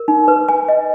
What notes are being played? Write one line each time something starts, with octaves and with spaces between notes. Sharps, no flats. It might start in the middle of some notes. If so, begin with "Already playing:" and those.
Already playing: A#4
D#4
B4
G#5
D#5